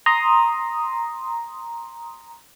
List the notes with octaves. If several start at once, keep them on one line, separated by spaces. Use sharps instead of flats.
A#5 C6 D#6